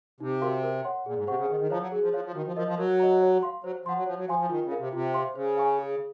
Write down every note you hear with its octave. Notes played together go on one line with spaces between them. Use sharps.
C3 D#4
F#4 A#4 F5 C6
A#4
C#5 F#5 C6
A#2 G#4
G#2
C3 C5 F#5 C#6
C#3
D#3 G#4
D#3
F3 C#5 F5 A#5
F#3
F#3 G#4
F3
F3 C#5 F5
F3
D#3 F#4
F3
F3 A#4 D#5
F3
F#3 A#4
D#5 A#5
C#5
F5 C6
F#3 C5
F3 F#5 C6
F#3
F3 C#5
F#3
F3 F5 G#5 C6
F3
D#3 F4
C#3
A#4 F5
C3
C3 F4
C5 F5 C6
C#3 C5
F5 G#5 C#6
G#4